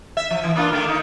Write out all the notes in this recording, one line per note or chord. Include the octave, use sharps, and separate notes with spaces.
E5
F3
E3
A#3 D4 F4
D#3 A3
D#4